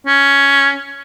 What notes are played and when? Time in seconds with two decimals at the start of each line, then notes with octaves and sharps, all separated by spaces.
0.07 C#4